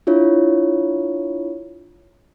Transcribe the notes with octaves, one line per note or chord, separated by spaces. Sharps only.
D4 E4 F4 C#5